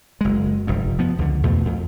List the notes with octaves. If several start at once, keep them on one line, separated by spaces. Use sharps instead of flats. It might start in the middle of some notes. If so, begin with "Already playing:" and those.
F#1 G#3
F1 G2
F3 B3
C#2 D3
E2 B2 A3
F2